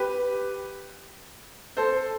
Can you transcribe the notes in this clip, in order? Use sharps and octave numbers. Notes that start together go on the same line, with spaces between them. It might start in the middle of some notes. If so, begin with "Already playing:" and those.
Already playing: G4 B4
A4 C5